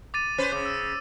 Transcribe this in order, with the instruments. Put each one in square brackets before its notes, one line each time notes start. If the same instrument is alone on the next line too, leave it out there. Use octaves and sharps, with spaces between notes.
[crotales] D6 A6 D#7
[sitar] C#4 B4 C5
[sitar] C#3 [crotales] D6
[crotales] E6